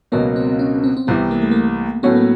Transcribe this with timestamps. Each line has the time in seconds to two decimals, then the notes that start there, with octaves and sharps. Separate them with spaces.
0.12 C#2 B2 F#3 A#3 B3
0.36 C4
0.59 C#4
0.84 C4
0.97 C4
1.07 C2 C3 E3 B3
1.31 A#3
1.42 A3
1.51 A#3
2.03 A2 F#3 A3 B3 C#4 F#4
2.15 A#3